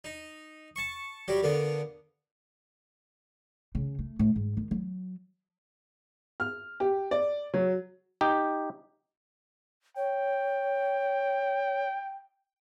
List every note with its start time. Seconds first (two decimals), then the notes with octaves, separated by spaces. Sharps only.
0.04 D#4
0.76 A5 C#6
1.28 F#3 G3 G4
1.43 A#2 D3 B3
3.75 C#3
3.99 A3
4.19 A2
4.36 G#2
4.57 D#3
4.71 F#3
6.40 F6
6.80 G4
7.11 D5
7.54 F#3
8.21 D#4 G4
9.97 C#5 G5